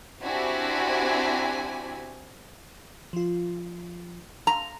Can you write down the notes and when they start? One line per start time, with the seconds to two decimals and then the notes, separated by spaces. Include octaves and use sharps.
0.22 C4 D4 E4 F#4 G4 G#5
3.13 F3 F4
4.47 F5 A#5